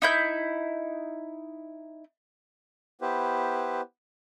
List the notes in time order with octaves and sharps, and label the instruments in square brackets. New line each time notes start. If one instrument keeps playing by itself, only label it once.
[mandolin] D#4 E4 G6
[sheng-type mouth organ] B3 E4 G4 B4 C5